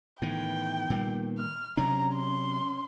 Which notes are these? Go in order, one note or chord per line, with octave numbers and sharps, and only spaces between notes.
A2 D#3 E3 B3 G5
A#2 G3 A#3
F6
C3 F#3 C#4 D4 A#5
C6